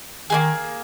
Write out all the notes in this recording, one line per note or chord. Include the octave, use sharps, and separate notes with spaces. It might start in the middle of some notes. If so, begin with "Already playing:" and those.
D#3 A#3 D#4 G#4